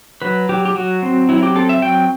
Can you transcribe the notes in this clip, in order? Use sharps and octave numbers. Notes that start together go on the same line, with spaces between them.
F#3 B4
F#3 G4
G4
F#3 F#4
C4
F#3 E4
G4
C4 A4
E5
F#3 G5